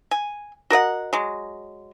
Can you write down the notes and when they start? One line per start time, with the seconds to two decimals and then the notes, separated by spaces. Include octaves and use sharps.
0.11 G#5
0.70 F#4 A#4 D#5 F#5
1.13 F#3 G#3